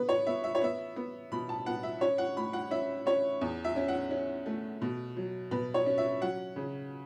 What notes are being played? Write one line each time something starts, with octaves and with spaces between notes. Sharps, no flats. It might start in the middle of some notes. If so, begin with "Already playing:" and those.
Already playing: B3 B4
C#5
B3 E5
E5
C#5
B3 E5
B3
B2 B5
A5
B3 F#5
E5
C#4 C#5
F#5
A2 B5
F#5
C#4 E5
C#4 C#5
E2
E5
C#4
F#5
C#4
A3
B2
F#3
B2 B4
C#5
C#4
E5
F#3 F#5
C#3